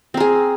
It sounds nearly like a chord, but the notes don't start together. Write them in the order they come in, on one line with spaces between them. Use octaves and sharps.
C4 A#4 G#4